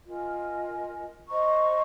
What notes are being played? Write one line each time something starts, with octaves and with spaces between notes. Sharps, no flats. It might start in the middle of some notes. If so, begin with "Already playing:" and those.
F4 A#4 D#5 G#5
C5 D#5 A#5 C#6